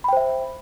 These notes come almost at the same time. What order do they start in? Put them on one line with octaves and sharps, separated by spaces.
B5 G5 C5 E5